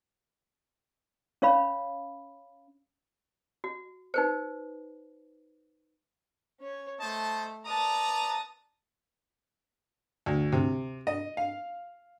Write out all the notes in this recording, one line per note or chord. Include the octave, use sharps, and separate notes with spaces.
C#4 C#5 F5 B5
F#4
D#4 B4 C5
C#4 C#5
A3 C5 D#5 A5
B4 D5 A5 A#5 D#6
D2
C3
D#5
F5